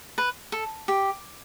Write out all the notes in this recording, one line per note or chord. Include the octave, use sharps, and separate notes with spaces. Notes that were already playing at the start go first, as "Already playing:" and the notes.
B4
A4
G4